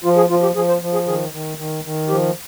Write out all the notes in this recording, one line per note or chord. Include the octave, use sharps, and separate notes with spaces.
F3 F4
G#4
F3 F4
G4
F3 G#4
C5
F3
G#4
D#3 G#4
D#3
D#3
D#3
F3 G4